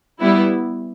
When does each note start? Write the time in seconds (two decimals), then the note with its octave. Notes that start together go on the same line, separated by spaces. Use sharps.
0.21 G3 B3 E4